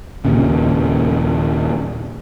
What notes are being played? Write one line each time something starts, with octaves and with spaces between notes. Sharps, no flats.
D#2 A#2 C#3